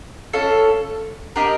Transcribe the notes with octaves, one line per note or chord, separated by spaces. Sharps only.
C#4 F4 A4
D4 G4 A#4 D#5